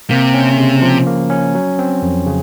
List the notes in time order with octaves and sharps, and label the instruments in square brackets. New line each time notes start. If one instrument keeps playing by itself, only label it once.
[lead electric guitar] C3 [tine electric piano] A#3
[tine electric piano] C#4
C#3
F3
A#3
C#4
F#3
C4
F2
C#3